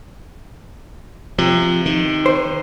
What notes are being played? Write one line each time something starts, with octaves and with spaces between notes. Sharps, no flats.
C3 F3
D#3
C5